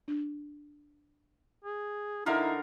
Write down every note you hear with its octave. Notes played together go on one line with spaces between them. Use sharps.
D4
G#4
D3 D#4 E4 A#4 F5